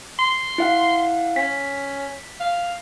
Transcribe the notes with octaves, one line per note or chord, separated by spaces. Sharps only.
C6
E4 F5 F#5
C#4 B6
F5